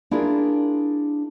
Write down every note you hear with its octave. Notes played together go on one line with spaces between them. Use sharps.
D4 E4 F4 G#4 A#4